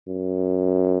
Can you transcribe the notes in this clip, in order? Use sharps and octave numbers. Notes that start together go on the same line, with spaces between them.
F#2